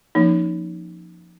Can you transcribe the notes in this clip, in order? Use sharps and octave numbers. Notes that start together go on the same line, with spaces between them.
F3 A#3 C#4 D#4